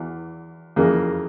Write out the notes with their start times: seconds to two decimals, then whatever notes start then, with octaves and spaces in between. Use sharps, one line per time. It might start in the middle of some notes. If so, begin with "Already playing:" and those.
Already playing: E2 E3
0.76 F2 C#3 E3 G#3 A#3